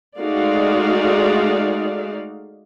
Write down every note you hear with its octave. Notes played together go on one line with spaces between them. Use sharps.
G#3 A3 D#4 F#4 D5 F5